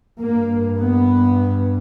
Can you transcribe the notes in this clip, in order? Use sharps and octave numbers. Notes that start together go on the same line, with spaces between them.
G2 A#3
B3